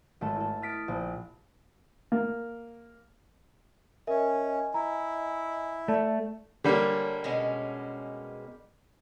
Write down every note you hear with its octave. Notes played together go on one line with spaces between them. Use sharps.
G#1 A3 A4
E4 A4
D#6 F6 A6 B6 C7 D7
A#1
A#3
C#4 A#4 D#5 E5 G#5
E4 A#5
A3 D5 A5
D3 G3 A#3 D4 C#5
B2 G#3 C#4